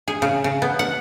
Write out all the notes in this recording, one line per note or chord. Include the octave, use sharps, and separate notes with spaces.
G#4
C#3
C#3
B3
F#5